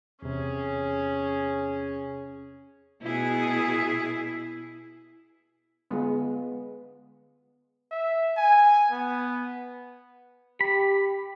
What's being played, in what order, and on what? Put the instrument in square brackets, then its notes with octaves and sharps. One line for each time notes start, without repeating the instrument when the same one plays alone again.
[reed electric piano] E2 C3 [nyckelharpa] C#4 G#4
[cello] B2 G#4 [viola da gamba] E4
[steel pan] D3 G#3 F4 [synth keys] B3
[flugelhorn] E5
G#5
B3
[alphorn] G4 [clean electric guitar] B5